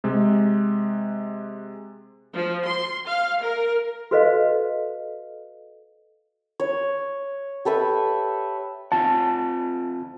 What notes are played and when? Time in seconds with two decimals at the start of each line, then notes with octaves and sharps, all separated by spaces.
0.04 C3 G#3
2.34 F3
2.64 C6
3.06 F5
3.42 A#4
4.11 F#4 A4 B4 C5 D#5 F5
6.60 C#5
7.65 G4 A4 B4 E5
8.92 C4 F4 F#5 A5